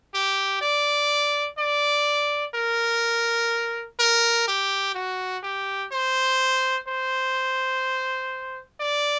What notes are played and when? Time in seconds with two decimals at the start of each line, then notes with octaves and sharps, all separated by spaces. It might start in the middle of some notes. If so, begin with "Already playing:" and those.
0.14 G4
0.61 D5
1.58 D5
2.55 A#4
4.00 A#4
4.48 G4
4.95 F#4
5.43 G4
5.92 C5
6.88 C5
8.80 D5